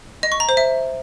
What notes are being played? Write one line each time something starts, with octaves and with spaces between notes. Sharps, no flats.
D#5
C#6
A#5
C5
E5